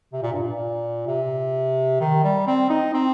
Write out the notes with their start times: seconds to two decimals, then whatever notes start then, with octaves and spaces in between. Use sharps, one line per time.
0.13 C3
0.22 A#2
0.32 G2
0.42 A#2
1.07 C3
2.00 D#3
2.24 G3
2.47 C4
2.70 D#4
2.94 C4